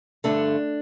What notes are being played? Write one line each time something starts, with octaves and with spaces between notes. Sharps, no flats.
G2 D3 A3 D4